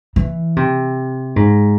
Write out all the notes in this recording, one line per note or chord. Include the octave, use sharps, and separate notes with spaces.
E3
C3
G#2